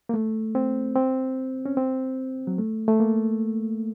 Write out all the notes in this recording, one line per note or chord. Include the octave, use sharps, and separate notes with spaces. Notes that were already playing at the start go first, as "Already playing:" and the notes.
A#3
A3
C4
C4
C#4
C4
F#3
A3
A3
A#3